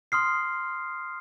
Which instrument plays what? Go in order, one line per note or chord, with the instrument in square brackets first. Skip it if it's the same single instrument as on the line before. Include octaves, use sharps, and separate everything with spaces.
[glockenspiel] C6 D#6 F6 C7